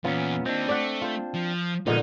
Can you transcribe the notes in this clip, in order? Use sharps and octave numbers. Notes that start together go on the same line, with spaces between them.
E2 A#2 B3 C#4 F4
A#3 C4 D4 D#4
A3 D5 F#5
F4 C5
F3
A#2 D3 F3 G#3 B3 D#4